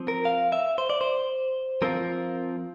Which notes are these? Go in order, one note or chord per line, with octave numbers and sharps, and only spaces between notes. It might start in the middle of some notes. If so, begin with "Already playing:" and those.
Already playing: F3 C4
A#4
F5
E5
C5
D5
C5
F3 C4 F4 A#4